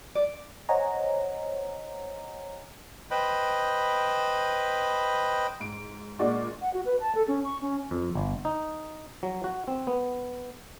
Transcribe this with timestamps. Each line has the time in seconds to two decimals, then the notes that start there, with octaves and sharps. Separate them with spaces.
0.15 D5
0.69 C5 C#5 D#5 F#5 G#5 A#5
3.11 B4 C5 D#5 G5 B5
5.60 G#2 D7
6.19 A#2 G#3 D4 F#4 D5 C#6
6.61 F#5
6.74 F#4
6.85 B4
7.00 A5
7.15 A4
7.28 C#4
7.44 C#6
7.61 C#4
7.91 F2
8.15 G1
8.45 D#4
9.23 F#3
9.44 F#4
9.68 C4
9.87 B3